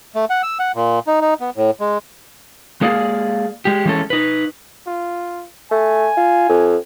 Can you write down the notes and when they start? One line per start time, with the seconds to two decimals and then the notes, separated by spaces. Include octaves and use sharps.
0.15 A3
0.30 F#5
0.43 E6
0.59 F#5
0.75 A#2
1.07 D#4
1.21 D#4
1.41 B3
1.56 A2
1.80 G#3
2.81 G#3 A#3 G#4 D5 F5
3.65 G#3 G4
3.85 E3 G#3 C#4 A4
4.10 D#4 B4
4.87 F4
5.71 A3 G#5
6.17 F4
6.49 F2